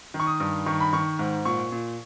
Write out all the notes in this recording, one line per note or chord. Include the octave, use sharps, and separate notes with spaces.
D#3
C#6
D#6
G2
D#3 C#6
B5
D#3 C#6
G#2
A#2 C#6
A#2